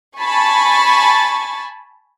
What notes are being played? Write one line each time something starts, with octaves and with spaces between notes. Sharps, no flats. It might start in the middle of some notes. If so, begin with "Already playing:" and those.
G#5 A5 B5 C#6 A6